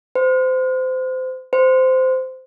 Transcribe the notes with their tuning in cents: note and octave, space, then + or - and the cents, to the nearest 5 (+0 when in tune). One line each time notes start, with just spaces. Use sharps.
C5 -25
C5 -15